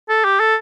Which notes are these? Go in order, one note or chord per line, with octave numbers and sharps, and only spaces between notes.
A4
G4
A4